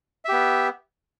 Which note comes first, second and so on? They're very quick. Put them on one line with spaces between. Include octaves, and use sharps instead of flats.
E5 G4 B3